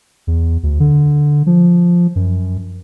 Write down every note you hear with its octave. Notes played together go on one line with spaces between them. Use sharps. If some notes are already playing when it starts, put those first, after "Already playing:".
E2
D2
D3
F3
F#2